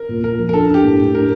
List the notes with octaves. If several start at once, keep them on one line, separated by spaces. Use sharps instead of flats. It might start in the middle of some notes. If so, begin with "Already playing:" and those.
Already playing: A#4
A#2
A#2 A#4
F3
A#4
D4 A4
D4
G4
A2
A2
D4 A#4